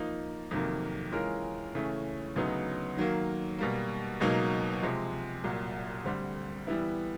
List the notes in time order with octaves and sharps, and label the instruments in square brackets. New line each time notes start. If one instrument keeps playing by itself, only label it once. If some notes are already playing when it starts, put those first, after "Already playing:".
Already playing: [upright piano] F3 A#3 D#4
F2 C3 D#3 F#3 A#3
E3 G#3 C#4 F4 A#4
C#3 E3 A3 C#4
D2 C#3 F#3 B3 D#4
D#3 F#3 A#3
B2 G3 A#3
C#2 B2 F#3 A#3 D#4
C3 F3 G#3
C2 A#2 F#3
D2 D3 G3 C4
E3 G3 B3 E4